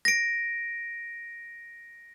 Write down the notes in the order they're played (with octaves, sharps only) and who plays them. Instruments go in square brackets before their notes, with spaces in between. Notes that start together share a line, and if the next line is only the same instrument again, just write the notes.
[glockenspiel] A#6 D7